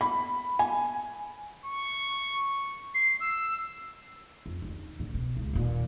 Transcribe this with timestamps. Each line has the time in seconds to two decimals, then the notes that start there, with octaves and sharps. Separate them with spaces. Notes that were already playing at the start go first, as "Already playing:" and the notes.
0.01 B5
0.59 G#5
1.66 C#6
2.94 C7
3.20 E6
4.46 F2
4.62 D#2 D3
5.00 A2 D3
5.14 B2
5.37 C#2
5.53 D#2 A#2